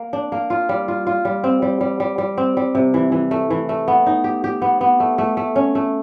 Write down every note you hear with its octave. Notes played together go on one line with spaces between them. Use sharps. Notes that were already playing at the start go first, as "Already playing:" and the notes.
Already playing: A#3
D4
A#3
F4
G3
F4
F4
G3
C4
G3
G3
G3
G3
C4
G3
C3
E3
E3
A3
E3
A3
B3
D#4
G4
G4
B3
B3
A3
A3
A3
C#4
A3